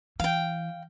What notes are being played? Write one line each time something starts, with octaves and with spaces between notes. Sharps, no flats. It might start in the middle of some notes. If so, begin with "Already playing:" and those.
E3 F5 G5